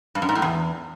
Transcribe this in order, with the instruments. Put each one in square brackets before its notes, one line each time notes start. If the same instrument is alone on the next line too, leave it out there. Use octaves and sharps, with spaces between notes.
[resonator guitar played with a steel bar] G2
F#2
G#2
A2
E2